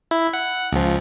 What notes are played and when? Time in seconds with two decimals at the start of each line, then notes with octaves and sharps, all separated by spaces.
0.11 E4
0.33 F#5
0.72 C#2 F3